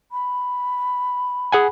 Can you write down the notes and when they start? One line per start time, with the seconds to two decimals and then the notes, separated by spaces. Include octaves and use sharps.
0.12 B5
1.52 G#4 F#5 G#5